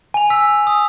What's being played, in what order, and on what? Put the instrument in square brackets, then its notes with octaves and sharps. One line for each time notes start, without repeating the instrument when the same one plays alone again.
[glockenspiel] G#5 F7
E6 B6
D#6